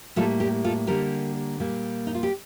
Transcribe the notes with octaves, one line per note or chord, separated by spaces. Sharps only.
A2 G3 A#3 F4 A4
G4 A#4
F4 A4
D3 G3 A#3 G4 A#4
A#2 G3 A#3
D#4
F4
G4